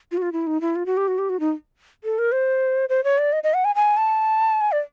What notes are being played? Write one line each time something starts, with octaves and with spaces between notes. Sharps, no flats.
F4
F#4
F4
E4
D#4
E4
F4
F#4
G4
F#4
G4
F#4
D#4
A4
A#4
C5
C5
C#5
D5
D#5
D#5
F#5
G#5
G#5
A5
G#5
D5